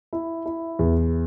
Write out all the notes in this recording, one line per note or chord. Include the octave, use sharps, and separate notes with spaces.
E4
E4
E2